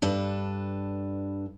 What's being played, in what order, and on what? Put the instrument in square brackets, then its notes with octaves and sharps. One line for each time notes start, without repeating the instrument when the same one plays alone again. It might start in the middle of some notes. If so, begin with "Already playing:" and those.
[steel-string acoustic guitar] G2 D4 A4 B4